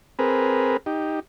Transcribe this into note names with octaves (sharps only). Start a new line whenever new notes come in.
C4 G#4 A#4 B4
D#4 G4